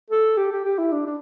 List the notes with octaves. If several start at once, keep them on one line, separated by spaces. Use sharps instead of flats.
A4
G4
G4
G4
E4
D4
D4